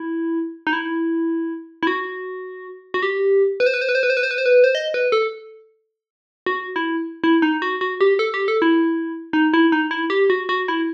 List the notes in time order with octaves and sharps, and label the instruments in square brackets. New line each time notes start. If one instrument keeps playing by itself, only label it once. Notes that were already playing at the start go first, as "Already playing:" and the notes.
Already playing: [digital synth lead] E4
D#4
E4
E4
F#4
F#4
G4
B4
C5
B4
C5
B4
C5
B4
C5
B4
C5
B4
C5
B4
C5
D#5
B4
A4
F#4
E4
E4
D#4
F#4
F#4
G4
A4
G4
A4
E4
D#4
E4
D#4
E4
G4
F#4
F#4
E4